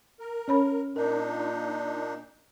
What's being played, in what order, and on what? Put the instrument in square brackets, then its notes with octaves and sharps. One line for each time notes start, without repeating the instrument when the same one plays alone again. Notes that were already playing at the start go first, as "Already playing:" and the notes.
[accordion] A#4
[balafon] C#4 C#5 B5
[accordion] A#2 D4 D#4 [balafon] A#4